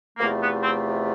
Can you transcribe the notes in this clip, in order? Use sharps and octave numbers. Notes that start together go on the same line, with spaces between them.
E2 C3 F3 A3 A#3
B3
C4